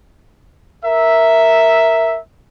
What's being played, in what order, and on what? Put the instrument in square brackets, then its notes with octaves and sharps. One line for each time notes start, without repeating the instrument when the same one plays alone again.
[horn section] A#4 E5